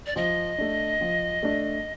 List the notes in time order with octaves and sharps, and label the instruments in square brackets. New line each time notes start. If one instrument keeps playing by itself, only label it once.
[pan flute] D5
[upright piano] F3 [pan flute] D#5
[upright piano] A3 D4
F3
A3 D4